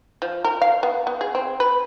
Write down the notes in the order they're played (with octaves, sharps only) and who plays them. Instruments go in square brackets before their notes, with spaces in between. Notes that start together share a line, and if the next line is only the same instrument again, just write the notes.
[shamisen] F3
A#4
F5
B3
B3
G#4
C4
B4